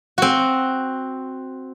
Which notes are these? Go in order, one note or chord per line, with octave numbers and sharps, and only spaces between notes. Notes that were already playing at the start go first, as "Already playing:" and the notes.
C4 F#4